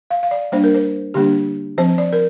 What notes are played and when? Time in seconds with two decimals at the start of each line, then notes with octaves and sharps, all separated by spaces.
0.10 F5
0.23 F5
0.31 D5
0.52 G3 A#3 D4 C5
0.64 A#4
0.75 C5
1.14 D3 G3 A#3 D4 G4
1.78 F3 C4 C5
1.98 D5
2.13 A#4